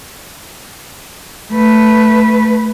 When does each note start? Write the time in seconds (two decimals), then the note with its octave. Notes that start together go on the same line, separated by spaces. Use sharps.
1.52 A3 B4